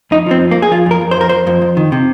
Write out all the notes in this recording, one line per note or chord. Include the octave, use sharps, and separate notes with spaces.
F2 D#4
F3 C4
F2
A#3
F2
G#4
F3 F4
F2 A#4
F2
C5
F2 A#4
F2 C5
F2
F2
D#3
C3